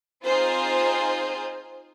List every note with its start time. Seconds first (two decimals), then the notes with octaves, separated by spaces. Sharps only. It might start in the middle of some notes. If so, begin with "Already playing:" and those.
0.24 C4 D#4 F4 G#4 C5